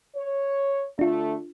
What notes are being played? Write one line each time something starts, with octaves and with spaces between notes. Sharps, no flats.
C#5
D3 A3 D4 F4